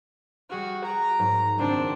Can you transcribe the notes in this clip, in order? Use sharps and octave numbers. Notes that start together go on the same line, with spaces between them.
G3 F#4 G#4 F6
A#5 F#6 D7
G#2 F#3 A#4
F#1 D#2 C4 D4 C5